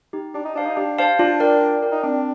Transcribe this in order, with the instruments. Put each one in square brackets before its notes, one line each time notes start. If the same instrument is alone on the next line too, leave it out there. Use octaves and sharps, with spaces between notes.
[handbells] D#4 G4
[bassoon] D4 [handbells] G4
[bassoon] D#4
[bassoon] D4 [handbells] C5 F5 A5
[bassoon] D#4
[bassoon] D4 [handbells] G4
[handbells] C5 F5 A5
[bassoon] D4 [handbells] F4
[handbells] A#4 D5 G5
F4
A#4 D5 G5
[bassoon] D#4
[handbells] C4 [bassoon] D4